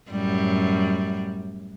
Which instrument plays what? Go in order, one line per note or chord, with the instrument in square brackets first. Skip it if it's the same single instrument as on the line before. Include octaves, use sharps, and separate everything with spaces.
[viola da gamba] F#2 A2 G3